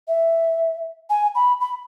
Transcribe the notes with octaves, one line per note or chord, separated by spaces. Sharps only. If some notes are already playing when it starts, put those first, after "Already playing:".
E5
G#5
B5
B5